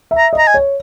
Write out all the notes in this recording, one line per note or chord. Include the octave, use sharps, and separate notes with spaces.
E5
A#5
D#5
A#5
G#5
C#5